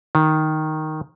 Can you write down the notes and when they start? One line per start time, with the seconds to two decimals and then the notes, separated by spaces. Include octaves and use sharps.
0.15 D#3